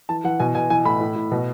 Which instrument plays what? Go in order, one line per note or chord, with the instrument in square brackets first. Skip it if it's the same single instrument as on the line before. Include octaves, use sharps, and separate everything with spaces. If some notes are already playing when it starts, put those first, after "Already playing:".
[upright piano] E3 A5
E3 F#5
B2 G#5
B2 G#5
E3 G#5
A2 B5
A2
A2
B2